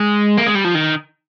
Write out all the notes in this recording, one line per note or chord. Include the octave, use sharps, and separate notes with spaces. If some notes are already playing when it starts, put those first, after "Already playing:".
Already playing: G#3
A#3
G#3
G3
F3
D#3